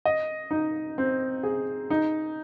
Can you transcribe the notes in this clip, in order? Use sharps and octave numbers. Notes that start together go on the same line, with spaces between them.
D#5
D#4
C4
G#4
D#4